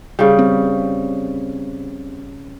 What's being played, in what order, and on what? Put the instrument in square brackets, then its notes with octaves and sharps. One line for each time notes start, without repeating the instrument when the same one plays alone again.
[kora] C#3 G3
[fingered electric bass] C4